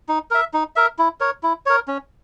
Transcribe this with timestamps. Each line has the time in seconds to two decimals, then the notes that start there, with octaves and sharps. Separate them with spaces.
0.09 D#4
0.31 A#4 E5
0.53 D#4
0.76 A#4 E5
0.98 E4
1.20 A#4 C#5
1.43 E4
1.66 A#4 C#5
1.88 C#4